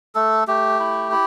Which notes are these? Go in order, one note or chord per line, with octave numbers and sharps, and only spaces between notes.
A3 A4
A3 G4
E4
E4